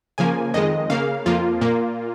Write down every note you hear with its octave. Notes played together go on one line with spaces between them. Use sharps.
C#3 F3 A#3 G#5
F2 D#3 G#3 D#5
C#3 A#3 F5
F2 F3 A#3 F4
A#2 A#3